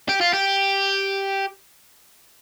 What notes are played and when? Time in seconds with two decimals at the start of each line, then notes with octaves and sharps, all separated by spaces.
0.09 G4
0.21 F4
0.33 G4